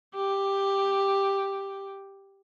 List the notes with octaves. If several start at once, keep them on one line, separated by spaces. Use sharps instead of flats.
G4